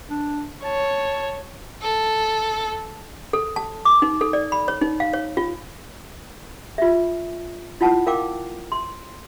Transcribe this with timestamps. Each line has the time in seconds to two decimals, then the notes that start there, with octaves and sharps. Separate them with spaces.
0.10 D4
0.64 C#5 A5
1.82 A4
3.33 A4
3.56 A5
3.85 D6
4.02 D#4
4.21 A4
4.33 D5
4.52 B5
4.68 C#5
4.82 D#4
5.00 F5
5.13 C#5
5.37 F4
6.78 F4 E5
7.81 E4 F4 F#5 A5
8.07 A#4 F5 G5 D6
8.72 C6